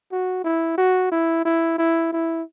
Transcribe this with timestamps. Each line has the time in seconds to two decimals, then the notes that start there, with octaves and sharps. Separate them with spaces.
0.12 F#4
0.44 E4
0.78 F#4
1.12 E4
1.45 E4
1.78 E4
2.12 E4